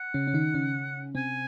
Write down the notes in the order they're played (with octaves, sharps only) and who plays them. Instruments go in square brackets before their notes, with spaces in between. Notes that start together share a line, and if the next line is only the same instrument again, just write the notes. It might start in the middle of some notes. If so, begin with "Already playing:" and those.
Already playing: [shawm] F#5
[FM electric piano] C#3 C#4
C#4
D#3 D#4
C#3 C#4
[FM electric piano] C3 C4 [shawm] G#5